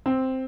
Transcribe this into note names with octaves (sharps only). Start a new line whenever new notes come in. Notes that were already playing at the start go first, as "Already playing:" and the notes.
C4